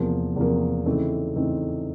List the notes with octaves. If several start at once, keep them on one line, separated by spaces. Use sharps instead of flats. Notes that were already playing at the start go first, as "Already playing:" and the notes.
Already playing: E2 C3 F3 A#3
E2 C3 F3 A#3
C#3 E3 A3 C4 D#4
C#3 E3 A3 C4 D#4